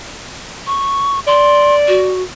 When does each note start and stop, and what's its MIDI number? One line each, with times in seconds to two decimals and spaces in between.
0.66 1.20 85
1.27 2.14 74
1.27 1.75 84
1.88 2.22 66